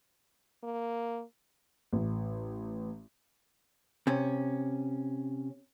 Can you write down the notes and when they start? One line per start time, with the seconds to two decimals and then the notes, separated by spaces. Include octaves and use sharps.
0.63 A#3
1.93 A1
4.07 C3 C#4